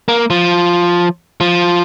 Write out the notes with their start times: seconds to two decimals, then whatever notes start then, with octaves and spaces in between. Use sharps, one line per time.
0.08 A#3
0.30 F3
1.41 F3